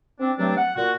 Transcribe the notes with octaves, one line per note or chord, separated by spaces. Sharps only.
C4 D4
G2 F#3 A3 C4 D4
F#5
A#2 F#4